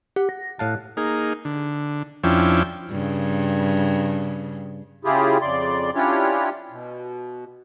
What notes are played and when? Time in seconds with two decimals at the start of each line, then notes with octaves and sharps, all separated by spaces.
0.16 G4 F#5
0.29 A#6
0.59 A2 F5 A5 F#6
0.97 A#3 D#4 G#4
1.45 D3
2.24 F2 F3 C#4 D4 E4 G5
2.90 G2 C#3
5.05 C#3 E4 F4 G4 G#4
5.42 F2 C#3 D5 C6
5.95 C#4 D4 E4 F4 G4 C#5
6.71 B2